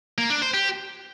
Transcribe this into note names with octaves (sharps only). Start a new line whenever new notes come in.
A#3
D4
C5
G4